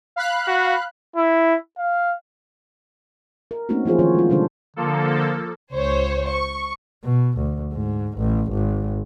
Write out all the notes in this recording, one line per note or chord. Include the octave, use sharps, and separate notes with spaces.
F5 B5 F#6
F#4
E4
F5
A#4
A3 A#3 C4 C#4 D#4 F#4
E3 F3 F4 G#4 C5
D#3 F3 C#4 F#4 C#5
G#3 F4
B2 D3 G3 D4 A4 C5
D3 F3 A#3 A4
C#2 C5 C#5
C#6
B2
D2
G#2
A1
G#1